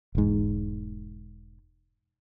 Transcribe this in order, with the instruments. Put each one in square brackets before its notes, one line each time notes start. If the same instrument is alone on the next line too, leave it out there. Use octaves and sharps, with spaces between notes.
[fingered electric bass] E1 G#2